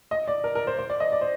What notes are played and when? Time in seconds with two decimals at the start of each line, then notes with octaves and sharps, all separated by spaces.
0.11 D#5
0.28 D5
0.44 A#4
0.55 A#4
0.67 C5
0.78 C5
0.90 D5
1.00 D#5
1.12 D5
1.21 C5